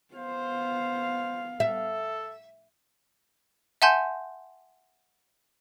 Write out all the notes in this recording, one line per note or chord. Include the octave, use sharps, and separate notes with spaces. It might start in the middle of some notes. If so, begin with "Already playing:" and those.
B3 C5 F5
A4 E5
E5 F#5 G#5 A5 C6 G6